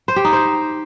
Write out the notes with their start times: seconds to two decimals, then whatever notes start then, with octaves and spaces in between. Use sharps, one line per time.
0.08 C5
0.16 G4
0.25 D#4
0.33 C5